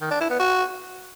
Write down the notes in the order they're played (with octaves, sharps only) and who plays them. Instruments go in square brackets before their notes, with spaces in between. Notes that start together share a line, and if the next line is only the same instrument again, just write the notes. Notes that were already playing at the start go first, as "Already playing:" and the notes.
[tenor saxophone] D#3
D4
E4
B3
F#4